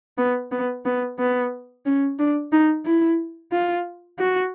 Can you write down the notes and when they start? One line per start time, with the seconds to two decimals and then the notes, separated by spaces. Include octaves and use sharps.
0.18 B3
0.52 B3
0.85 B3
1.19 B3
1.86 C#4
2.19 D4
2.52 D#4
2.85 E4
3.52 F4
4.19 F#4